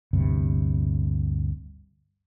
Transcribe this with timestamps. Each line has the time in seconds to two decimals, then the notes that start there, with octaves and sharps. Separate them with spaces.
0.13 G1 D2 G2 C3